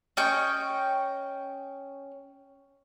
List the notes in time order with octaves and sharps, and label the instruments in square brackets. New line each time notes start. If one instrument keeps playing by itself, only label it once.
[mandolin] C#4 D#5 G5 C#6